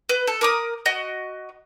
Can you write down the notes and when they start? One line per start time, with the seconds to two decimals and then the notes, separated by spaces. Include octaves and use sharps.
0.09 B4
0.27 A4
0.41 A#4 D6 D#6
0.86 F#4 D#5